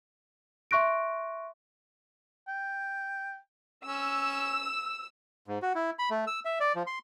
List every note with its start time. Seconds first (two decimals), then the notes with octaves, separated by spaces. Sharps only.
0.71 E5 C6 C#6 F#6 A#6 D7
2.48 G5
3.86 C#4 E6
5.48 G#2
5.62 F#4
5.75 E4
5.99 B5
6.10 A3
6.27 E6
6.45 E5
6.60 D5
6.75 F3
6.87 C6